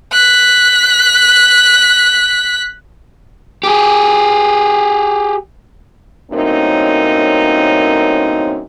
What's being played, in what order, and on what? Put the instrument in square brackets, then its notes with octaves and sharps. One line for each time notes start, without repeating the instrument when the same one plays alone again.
[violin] F#6 B6
[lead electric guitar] G4 G#4
[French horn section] F#2 A2 A#3 C4 C#4 D#4